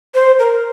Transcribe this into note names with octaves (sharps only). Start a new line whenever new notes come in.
C5
A#4